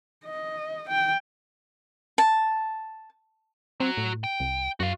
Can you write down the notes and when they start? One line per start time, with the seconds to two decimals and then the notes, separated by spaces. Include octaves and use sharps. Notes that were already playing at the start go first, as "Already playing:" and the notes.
0.25 D#5
0.89 G5
2.18 A5
3.80 F#3 C4 F#4
3.97 A2
4.24 G5
4.40 C2
4.80 F#2 F#4 F5